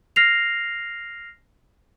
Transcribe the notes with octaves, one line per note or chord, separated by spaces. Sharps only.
F6 A#6 C7 F7